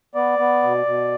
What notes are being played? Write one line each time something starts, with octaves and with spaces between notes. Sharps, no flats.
B3 D5
B3
B2
B2